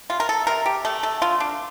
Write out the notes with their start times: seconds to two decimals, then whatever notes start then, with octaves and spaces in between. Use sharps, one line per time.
0.10 C3 F4
0.20 A#4
0.29 A4
0.47 C3 A#4
0.66 G4
0.85 A3 A4
1.03 A4
1.22 D3 F4
1.40 D4